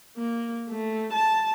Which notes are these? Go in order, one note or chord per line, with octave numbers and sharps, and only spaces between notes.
A#3
A3
A5